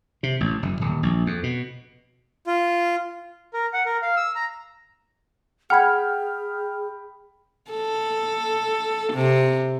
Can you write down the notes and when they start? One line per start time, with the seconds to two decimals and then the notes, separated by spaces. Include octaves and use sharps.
0.23 C3
0.40 A1
0.62 F#1
0.81 D#1
1.03 A#1
1.26 F2
1.43 B2
2.47 F4
3.53 A#4
3.73 F#5
3.86 A#4
4.02 F5
4.17 E6
4.36 A#5
5.70 G#4 F#5 G5 B5 F6 G#6
7.71 A4
9.13 C3